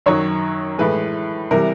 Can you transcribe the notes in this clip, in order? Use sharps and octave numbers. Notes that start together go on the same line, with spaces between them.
F#2 D#3 F#3 C#5
A2 E3 G#3 B4
C3 E3 G3 A#4